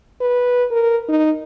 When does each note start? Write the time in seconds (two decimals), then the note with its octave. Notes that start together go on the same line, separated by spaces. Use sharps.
0.21 B4
0.71 A#4
1.09 D#4